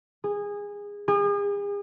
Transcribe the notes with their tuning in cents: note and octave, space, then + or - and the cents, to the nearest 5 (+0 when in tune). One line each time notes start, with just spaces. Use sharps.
G#4 -20
G#4 -40